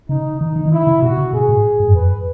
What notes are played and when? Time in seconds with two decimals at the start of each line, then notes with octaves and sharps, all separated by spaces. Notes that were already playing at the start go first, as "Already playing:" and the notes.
0.09 C#3 D#4
0.40 D#3 D#4
0.56 D#3
0.66 E3
0.71 D#3 E4
0.87 C#3
1.02 B2 F#4
1.17 C#3
1.33 B2 G#4
1.49 A2
1.80 G#2
1.87 F#2
1.95 E2 B4
2.02 F#2